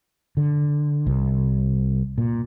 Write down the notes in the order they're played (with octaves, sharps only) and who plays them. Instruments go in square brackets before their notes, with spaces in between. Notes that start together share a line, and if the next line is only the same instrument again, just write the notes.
[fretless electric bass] D3
C2
A#2